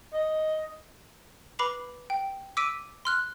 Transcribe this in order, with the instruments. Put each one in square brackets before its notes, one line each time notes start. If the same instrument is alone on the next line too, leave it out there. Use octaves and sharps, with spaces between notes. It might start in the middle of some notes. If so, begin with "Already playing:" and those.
[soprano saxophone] D#5
[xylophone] B4 B5 D6 C7 F7
G5
D6 E6 B6 D7 D#7
C6 F6 F#6